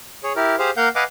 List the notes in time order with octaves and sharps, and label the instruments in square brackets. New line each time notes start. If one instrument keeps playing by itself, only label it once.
[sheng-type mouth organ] G#4 C#5
E4 G4 A#4
G4 G#4 C5 F5
A#3 A#4 F5 F#5 G6
B4 D#5 F5 F#5 G#5 D6